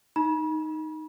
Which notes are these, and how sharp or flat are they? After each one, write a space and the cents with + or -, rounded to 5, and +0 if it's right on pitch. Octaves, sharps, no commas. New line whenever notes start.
D#4 +0 B5 -40